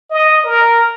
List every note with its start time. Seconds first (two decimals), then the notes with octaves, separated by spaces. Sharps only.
0.11 D#5
0.45 A#4